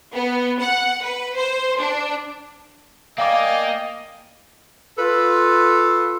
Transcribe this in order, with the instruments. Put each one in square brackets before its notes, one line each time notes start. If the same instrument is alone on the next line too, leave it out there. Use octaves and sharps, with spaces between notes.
[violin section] B3
F#5
B4
C5
D4
[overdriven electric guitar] A#3 [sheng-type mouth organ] D5 G5 G#5 [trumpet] D#5 [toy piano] F5 D6
[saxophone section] F4 A4 B4